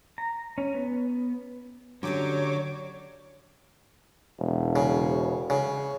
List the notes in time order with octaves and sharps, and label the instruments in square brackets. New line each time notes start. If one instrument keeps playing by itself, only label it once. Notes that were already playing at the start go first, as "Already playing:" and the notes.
[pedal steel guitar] A#5
C#4
B3
[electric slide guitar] D3 [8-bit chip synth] F#3 D6 [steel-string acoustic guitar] C#4 G4 D5 [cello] C#5
[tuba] E1
[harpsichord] C#3
C#3